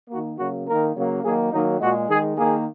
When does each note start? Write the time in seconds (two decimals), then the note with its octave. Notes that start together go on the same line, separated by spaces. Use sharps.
0.10 D#3 A#3 F#4
0.37 C#3 F#3 A#3 F#4
0.66 D#3 A#3 A#4
0.95 C#3 F#3 A#3
1.24 D#3 F#3 A#3 G#4
1.51 D#3 F#3 A#3 D#4
1.80 A#2 G#3 F#4
2.08 D#3 G#3 G#4
2.37 D#3 A#3 G#4